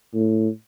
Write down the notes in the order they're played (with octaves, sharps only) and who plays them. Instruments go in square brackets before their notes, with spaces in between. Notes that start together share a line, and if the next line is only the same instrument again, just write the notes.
[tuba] A2